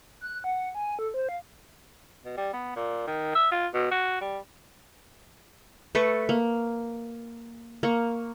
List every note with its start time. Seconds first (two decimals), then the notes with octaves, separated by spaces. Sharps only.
0.21 F#6
0.44 F#5
0.75 G#5
0.99 A4
1.14 C5
1.29 F5
2.24 B2
2.37 G3
2.53 B3
2.76 A#2
3.07 D#3
3.35 E5
3.52 F4
3.74 B2
3.91 F#4
4.21 G3
5.95 A3 A4 B4 C#6
6.29 A#3
7.83 A#3 C#6